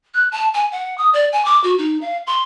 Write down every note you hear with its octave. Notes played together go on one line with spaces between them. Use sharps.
F#6
A5
G#5
F#5
D#6
D5
G#5
D6
F#4
D#4
F5
C6